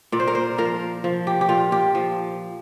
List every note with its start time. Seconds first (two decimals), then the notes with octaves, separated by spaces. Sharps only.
0.12 A#2 D5
0.20 C5
0.27 A#4
0.35 C5
0.58 F3 A#4
1.04 F3
1.27 G4
1.41 G4
1.49 A#2 F4
1.72 G4
1.95 F3